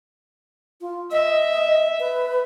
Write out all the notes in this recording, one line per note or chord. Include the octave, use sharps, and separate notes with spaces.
F4
D#5 E5
B4